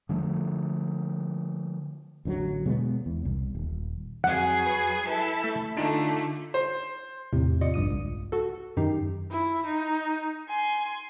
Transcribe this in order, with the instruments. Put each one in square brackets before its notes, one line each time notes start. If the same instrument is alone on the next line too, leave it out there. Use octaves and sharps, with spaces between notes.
[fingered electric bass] D3 F3 G#3 A3
[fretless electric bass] A1 D3 E3 F#3
B2 G#3 A#3 B3
E2
C2
D#1
[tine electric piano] F2 [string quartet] F#3 G#4 G#5 [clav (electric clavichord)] F#5
[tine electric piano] B4
[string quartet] E4 A4 [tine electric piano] B4
[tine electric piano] A3
[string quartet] D3 A3 [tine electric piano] D4 D#4 F4
[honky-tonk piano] C5
[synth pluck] E2 A2 C3
C3 F4 D5 D#5 C#7
A#1 G2 D#6 D#7
C#2
F#4 A4
F#2 D#3 D#4 G4 C7
[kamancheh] E4
D#4
G#5 C6